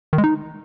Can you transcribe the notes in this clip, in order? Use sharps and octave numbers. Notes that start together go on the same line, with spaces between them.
D#3
G#3
D#4